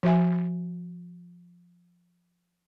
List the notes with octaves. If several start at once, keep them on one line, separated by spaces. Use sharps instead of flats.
F3 F#4 E5 G#5